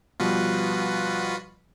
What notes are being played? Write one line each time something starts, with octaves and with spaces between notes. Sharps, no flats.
B2 F3 G3 F4 F#4 B4